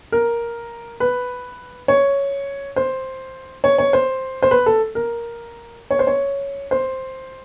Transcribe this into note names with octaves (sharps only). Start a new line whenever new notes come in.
A#4
B4
C#5
C5
C#5
C#5
C5
C5
B4
A4
A#4
C#5
C5
C#5
C5